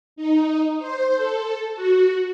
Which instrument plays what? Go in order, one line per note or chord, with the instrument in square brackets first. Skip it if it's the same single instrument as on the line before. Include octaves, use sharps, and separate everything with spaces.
[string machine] D#4
C5
A4
F#4